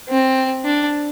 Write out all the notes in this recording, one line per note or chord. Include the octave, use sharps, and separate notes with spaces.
C4
D4